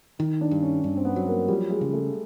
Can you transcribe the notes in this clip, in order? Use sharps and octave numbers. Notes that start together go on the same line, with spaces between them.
D#3 D#4
D4
G2
C#4
G2 D4
C4
B3
F#3
A#3
F3 G3
G#3
C#3
A3